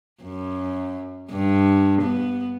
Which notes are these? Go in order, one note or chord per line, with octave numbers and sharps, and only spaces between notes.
F#2
G2
B3